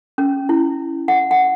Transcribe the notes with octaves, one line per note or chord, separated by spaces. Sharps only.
C#4
E4
F#5
F#5